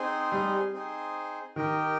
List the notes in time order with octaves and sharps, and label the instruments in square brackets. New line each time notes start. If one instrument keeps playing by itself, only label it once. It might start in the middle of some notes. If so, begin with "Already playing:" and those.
Already playing: [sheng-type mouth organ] C4 D#4 G#4 C5
[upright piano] G3
[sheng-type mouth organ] C4 D#4 G#4 C5
[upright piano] D#3 [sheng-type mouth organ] G4 A#4 D#5 G5